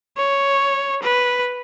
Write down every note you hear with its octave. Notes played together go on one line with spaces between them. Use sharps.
C#5
B4